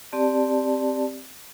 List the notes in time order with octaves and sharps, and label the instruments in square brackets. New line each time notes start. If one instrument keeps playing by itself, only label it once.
[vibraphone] C4 G4 D5 A5